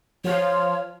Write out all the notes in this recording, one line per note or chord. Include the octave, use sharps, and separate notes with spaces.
F3 F4 C#5